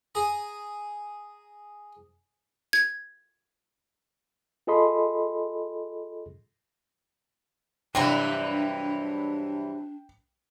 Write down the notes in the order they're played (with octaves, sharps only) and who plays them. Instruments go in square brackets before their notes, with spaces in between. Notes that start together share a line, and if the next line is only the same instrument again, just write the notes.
[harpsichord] G#4 A#5
[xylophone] G#6
[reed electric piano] F4 G#4 A4 D#5 B5 C6
[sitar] G2 E3 [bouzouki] C3 F#3 E4 [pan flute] D4 [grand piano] G5